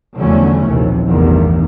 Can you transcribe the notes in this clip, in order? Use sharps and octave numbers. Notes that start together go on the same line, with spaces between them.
E2 D3 F3 F#3 A3 C#4
A#1 D#2 C3 E3
A1 E2 G2 D#3